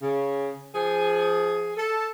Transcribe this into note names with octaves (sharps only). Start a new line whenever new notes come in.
C#3
F3 G#4
A4